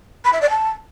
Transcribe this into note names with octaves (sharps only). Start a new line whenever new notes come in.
B5
E5
D5
A5